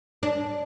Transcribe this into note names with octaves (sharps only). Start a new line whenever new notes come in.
D4